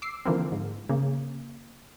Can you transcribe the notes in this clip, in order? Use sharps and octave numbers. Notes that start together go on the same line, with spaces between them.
D6 E6 C7
D3 E3 F3 A#3 C4
G#2
C#3 A#3